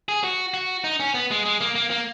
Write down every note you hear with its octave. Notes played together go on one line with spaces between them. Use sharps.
G#4
F#4
F#4
D#4
C#4
B3
G#3
G#3
A#3
A#3
A#3